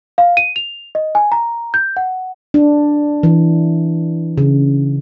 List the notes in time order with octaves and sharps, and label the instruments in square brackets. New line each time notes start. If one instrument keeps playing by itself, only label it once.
[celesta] F5
D#7
F7
D#5
G#5
A#5
G6
F#5
[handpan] D4
E3
C#3